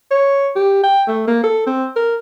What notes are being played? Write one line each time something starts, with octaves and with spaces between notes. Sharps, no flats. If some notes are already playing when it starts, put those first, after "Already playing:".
C#5
G4
G5
A3
A#3
A4
C4
A#4